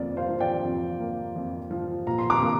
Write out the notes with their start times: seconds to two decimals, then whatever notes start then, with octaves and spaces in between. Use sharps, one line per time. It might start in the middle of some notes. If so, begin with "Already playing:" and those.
Already playing: F2 A#3 D5
0.17 C5 F5
0.29 F3
0.40 D5 G5
0.64 F2
1.00 A#3
1.36 F2
1.71 F3
2.07 A#2 A#5
2.18 C6
2.30 A#5 D6
2.42 A#3